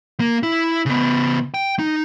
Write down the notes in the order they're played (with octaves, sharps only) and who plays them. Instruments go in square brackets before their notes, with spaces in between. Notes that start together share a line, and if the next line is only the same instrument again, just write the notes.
[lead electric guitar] A#3
E4
C#3 B3
G5
D#4